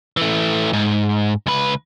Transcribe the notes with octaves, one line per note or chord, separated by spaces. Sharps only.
E3 A3
G#2
C#2 B4